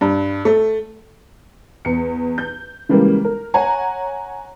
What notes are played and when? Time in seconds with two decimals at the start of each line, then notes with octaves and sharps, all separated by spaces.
0.01 G2
0.45 A3
1.85 E2 C#7
2.38 G6
2.89 C#3 E3 G3 G#3 A#3
3.24 A#4
3.54 C#5 F#5 G#5 A#5